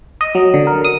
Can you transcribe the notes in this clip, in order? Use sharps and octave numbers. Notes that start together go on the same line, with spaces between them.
D#5
F#3
D3
A#4
D#6